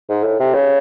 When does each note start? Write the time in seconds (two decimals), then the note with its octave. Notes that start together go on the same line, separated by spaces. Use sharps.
0.09 G#2
0.24 A2
0.40 C3
0.54 C#3